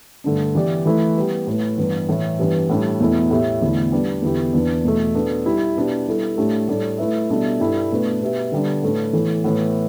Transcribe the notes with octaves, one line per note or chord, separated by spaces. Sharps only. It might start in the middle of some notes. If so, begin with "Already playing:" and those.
G2 D3 A3 D4
E3 B3 G4 D5
E3 A3 E4 B4
G3 B3 G4
A2 A3 E4 B4
G2 E3 B3
A2 E3 A3
G2 E3 B3 D4 G4
A2 G3 D4
E2 B2 A3 E4 A4
A2 A3 G4 E5
E2 D3 A3 E4
G3 D4 B4 D5
E2 D3 B3 E4 G4
E2 E3 B3 D4
E2 B2 A3
B2 B3 D4 A4
G3 E4 G4 E5
B2 B3 D4 G4 B4
G3 B3 E4 A4
A2 A3 D4 G4
A2 G3 D4 A4 D5
A3 E4 B4 E5
B2 G3 D4 A4 E5
G2 G3 E4 A4
B2 A3 D4 B4
B2 B3 G4 B4 E5
D3 G3 B3 D4
A2 A3 D4 B4
A2 E3 B3 E4 A4
A2 E3 B3